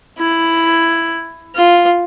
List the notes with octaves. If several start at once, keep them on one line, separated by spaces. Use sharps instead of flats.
E4
F4